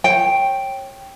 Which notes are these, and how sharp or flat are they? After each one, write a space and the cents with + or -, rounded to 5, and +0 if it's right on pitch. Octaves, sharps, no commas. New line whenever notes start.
C#5 -25 G5 +0